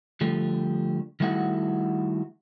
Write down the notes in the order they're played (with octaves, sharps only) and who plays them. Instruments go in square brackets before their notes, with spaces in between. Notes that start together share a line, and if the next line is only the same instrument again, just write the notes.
[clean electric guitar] D3 F3 G3 A3
D#3 G3 A3 E4 F#4 F#5